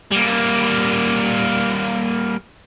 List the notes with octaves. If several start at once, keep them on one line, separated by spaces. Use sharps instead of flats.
G3 A#3